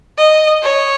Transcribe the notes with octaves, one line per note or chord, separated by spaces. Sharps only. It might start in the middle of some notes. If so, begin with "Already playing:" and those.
D#5
C#5